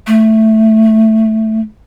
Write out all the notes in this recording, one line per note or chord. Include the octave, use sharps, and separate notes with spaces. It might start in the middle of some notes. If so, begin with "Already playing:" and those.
A3